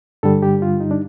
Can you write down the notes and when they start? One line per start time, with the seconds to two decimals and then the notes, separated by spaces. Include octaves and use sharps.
0.23 G2 D3 G3 A4
0.43 G4
0.62 F4
0.81 D#4
0.91 D4